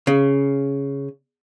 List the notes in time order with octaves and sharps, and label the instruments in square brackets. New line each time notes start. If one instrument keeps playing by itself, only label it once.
[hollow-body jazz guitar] C#3